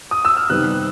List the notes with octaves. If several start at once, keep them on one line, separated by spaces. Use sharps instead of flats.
D#6
E6
F6
C3 D#3 G3 B3 F#6